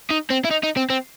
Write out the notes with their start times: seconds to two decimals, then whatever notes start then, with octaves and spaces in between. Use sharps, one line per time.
0.11 D#4
0.31 C4
0.45 E4
0.51 D#4
0.64 D#4
0.77 C4
0.90 C4